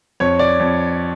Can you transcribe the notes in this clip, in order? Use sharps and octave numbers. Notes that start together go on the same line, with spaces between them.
F2 C#5
D5
F2